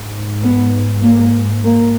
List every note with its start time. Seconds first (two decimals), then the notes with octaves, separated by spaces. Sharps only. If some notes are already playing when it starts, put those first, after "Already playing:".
Already playing: G#2
0.43 B3
1.03 A#3
1.64 A#3